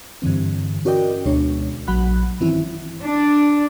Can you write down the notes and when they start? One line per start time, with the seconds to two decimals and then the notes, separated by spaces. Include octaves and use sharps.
0.22 G2 D3 E3 C4
0.85 C#4 F#4 A#4 D5 D#5 G5
1.25 D2 B2 G#3 D4 C#5
1.87 A#1 F#3 F#5 B5 F#6
2.40 G2 D#3 E3 C4 C#4 E4
3.03 D4